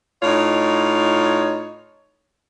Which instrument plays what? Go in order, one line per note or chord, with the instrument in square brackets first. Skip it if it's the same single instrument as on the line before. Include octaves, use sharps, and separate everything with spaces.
[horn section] A2 D#4 F4 C#5